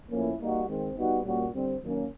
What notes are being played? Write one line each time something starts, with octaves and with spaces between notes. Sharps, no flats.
A2 F3 A#3 C#4 E4
G3 A#3 D#4 F#4
D#3 G#3 C4
G3 B3 D#4 F#4
A#2 G3 A#3 C#4 F#4
D3 G3 C4
D#3 F#3 A#3 C#4